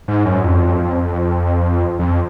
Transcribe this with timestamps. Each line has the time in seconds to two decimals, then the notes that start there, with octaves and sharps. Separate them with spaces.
0.08 G#2
0.25 F#2
0.43 F2
1.99 F2